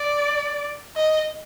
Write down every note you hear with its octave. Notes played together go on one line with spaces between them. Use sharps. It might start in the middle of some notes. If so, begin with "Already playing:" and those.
Already playing: D5
D#5